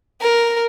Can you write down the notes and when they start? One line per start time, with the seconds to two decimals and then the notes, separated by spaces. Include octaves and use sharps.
0.21 A#4